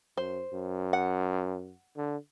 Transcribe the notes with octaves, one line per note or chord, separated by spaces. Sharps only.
F#2 C5
F#2
F#5
D3